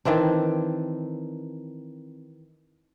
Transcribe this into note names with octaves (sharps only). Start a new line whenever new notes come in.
D#3 E3 C4 D4